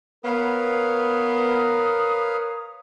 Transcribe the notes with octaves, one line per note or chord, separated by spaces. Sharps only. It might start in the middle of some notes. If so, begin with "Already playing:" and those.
B3 A#4 B4 C#5 F5 D#6